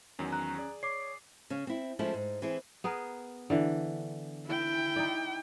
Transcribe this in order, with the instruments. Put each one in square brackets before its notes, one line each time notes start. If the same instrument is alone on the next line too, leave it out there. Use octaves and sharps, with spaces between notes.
[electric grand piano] E2 D#3 F#3 [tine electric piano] C#4
[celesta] A#5 F#6
[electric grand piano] G#4 D5
[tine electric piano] C#5 [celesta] D6 C7
[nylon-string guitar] C#3 C#4
C4 E4
F3 G#3 A3 C#4 E4
G#2
E3 C4 E4 G#4
[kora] B3 G#4 A#4
D3 E3
[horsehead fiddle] E4 G5
[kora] D#4 D5